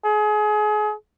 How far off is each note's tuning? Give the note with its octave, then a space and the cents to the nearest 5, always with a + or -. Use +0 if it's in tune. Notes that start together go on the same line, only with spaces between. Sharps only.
G#4 +30